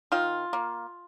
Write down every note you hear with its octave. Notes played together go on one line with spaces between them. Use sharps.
D#3 F4
A#3